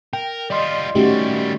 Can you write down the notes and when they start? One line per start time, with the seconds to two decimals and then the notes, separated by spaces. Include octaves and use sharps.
0.13 A#4 G5
0.50 G3 F4 D5 D#5 C6 F6 G6
0.95 D#3 G3 A3 C#4 D#4 F#4 G4 E5